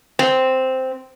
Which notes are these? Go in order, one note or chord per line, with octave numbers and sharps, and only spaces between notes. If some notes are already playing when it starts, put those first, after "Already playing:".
C4